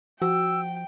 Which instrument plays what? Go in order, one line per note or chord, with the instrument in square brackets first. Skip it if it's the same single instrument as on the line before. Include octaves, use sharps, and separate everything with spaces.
[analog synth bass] F3 [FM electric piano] F#4 [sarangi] G5 [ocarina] E6